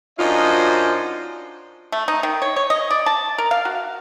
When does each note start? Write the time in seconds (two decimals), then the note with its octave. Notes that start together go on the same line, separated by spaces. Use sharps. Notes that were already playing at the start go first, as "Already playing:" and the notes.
0.19 F#2 D4 D#4 F4 C5 D#5
1.92 A3
2.08 D#4
2.23 D#3
2.42 C#5
2.56 C#5
2.70 D#5
2.91 D5
3.06 A5
3.38 A#4
3.51 F5
3.65 F#4